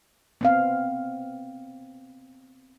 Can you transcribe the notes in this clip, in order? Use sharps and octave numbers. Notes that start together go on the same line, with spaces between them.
B3 C4 F5